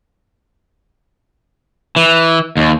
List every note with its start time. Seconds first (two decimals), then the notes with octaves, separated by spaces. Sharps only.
1.96 E3
2.57 D#2